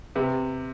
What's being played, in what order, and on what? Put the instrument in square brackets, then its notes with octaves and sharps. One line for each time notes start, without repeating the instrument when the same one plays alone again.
[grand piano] C3 [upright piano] G4 B4